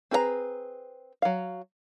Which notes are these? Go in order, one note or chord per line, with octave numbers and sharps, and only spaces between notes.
C4 G#4 B4 F5 A#5
F#3 F5